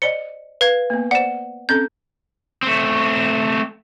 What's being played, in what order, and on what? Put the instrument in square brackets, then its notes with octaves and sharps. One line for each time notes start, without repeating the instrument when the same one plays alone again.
[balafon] C5 D5 D#5 [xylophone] C#7 G7
[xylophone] B4 F5 G#6
[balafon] A#3 B3
[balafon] C5 D5 [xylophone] F#5 E7
[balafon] C4 C#4 A4 [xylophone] G6
[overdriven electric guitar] A3 C4